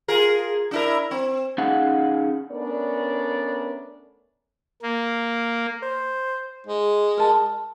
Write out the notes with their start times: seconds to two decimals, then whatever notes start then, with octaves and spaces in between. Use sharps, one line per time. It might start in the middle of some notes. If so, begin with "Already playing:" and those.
0.08 F4 G#4 A#4
0.71 D4 E4 A#4
1.11 C4
1.58 C#4 D#4 G#4 F5 F#5
2.52 A3 B3 C#4 D4 A#4 D5
4.82 A#3
5.82 C5
6.66 G#3
7.17 A#4 A5